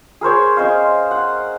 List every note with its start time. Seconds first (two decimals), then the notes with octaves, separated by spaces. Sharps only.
0.21 G#4 A#4 C5 C#5
0.57 C#4 C5 D#5 F5
1.11 F#5